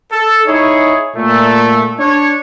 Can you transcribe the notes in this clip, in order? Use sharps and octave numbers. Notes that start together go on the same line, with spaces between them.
A4
D#4 E4 G#4 C#5
A#2 A3
D4 C#5